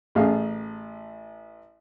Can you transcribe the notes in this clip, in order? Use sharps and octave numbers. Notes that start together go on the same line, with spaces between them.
A1 A3 G#4 F5